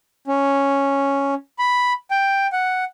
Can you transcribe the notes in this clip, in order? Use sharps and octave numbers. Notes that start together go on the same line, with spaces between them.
C#4
B5
G5
F#5